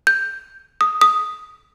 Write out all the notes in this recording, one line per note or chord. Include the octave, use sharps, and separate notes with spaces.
G6
D#6
D#6